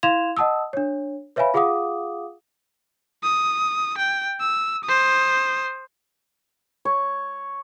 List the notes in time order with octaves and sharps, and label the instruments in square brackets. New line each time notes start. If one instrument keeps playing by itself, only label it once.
[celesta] E4 F5 C6 G#6 E7 F7
D#5 F#5 A5 D#6 E6
D4 C#5
B4 C#5 E5 F5 G#5 B5
F4 G#4 F5 F#5 D6 D#6
[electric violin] D#6
G5
E6
C5 D#6
[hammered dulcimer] C#5